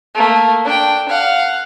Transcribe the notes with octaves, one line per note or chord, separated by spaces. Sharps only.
A3 A#3
D4 G5
F5 F#5